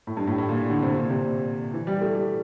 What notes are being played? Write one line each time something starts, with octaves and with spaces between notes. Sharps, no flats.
A2
G2
A2
A2
A#2
D3
C3
A#2
C3
E3
G3
A3
G3